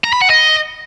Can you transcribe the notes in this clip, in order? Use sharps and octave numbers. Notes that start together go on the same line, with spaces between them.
A#5
B5
F#5
D#5